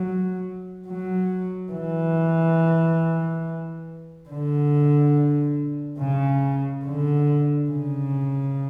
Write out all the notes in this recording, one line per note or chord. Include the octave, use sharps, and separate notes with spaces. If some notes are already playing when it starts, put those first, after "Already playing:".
Already playing: F#3
F#3
E3
D3
C#3
D3
C#3